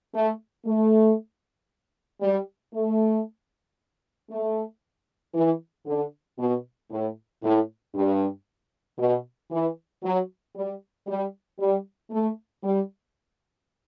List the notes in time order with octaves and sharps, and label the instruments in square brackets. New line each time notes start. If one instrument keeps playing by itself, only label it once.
[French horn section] A3
A3
G3
A3
A3
E3
D3
B2
A2
A2
G2
B2
E3
F#3
G3
G3
G3
A3
G3